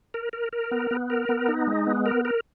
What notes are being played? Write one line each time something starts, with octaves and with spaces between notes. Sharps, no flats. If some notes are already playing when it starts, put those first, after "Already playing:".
A#4
A#4
A#4
B3
B3
A#4
B3
D#4
G#3
B3
A#4
A#4